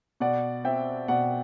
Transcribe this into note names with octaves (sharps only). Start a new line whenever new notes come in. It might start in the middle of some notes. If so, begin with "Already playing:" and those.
B2 D5 F#5
C4 E5 G5
B2 D5 F#5